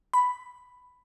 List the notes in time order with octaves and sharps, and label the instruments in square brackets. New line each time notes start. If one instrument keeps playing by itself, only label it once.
[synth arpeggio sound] B5